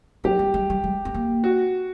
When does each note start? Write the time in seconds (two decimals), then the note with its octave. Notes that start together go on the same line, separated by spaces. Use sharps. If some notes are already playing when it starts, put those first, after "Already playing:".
0.24 F#3 G4
0.39 G3
0.54 G#3
0.70 G3
0.84 G#3
1.05 B3
1.14 A#3
1.44 F#4